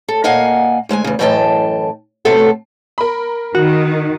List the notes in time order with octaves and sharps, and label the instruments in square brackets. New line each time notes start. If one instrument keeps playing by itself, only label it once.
[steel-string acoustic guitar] A4
A#2 A#3 D#5 F5 F#5 G#5
D2 G#3 E5 G#5
E2 C#3
F#2 A2 E3 D#5 G5 A5
C3 F#3 A3 B3 A4
[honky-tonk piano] A#4 B5
[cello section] D#3 [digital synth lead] F#4